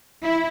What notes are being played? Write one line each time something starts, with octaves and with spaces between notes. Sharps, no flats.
E4